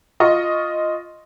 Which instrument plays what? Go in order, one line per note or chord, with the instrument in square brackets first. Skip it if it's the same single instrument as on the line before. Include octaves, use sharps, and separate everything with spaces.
[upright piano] F4 D#5 C#6